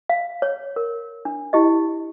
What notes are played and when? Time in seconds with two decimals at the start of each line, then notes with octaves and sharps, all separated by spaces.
0.09 F5
0.42 C#5
0.76 A#4
1.25 D4
1.53 E4 G4 D#5